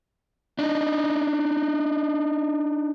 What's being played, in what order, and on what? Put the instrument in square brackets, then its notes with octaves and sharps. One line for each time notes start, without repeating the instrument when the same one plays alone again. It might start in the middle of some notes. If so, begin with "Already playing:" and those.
[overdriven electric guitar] D4 D#4